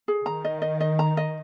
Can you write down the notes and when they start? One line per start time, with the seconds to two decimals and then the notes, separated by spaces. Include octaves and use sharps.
0.08 G#4
0.26 D#3 A#5
0.45 D#5
0.62 D#5
0.80 D#5
0.99 A#5
1.17 D#5